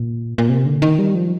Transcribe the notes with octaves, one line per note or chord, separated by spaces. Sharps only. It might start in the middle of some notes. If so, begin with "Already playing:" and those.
Already playing: A#2
A#2
C3
D3
D#3
G3
F3